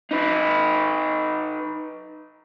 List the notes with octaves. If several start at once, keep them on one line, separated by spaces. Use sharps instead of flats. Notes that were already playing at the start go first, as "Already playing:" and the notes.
D#4 B4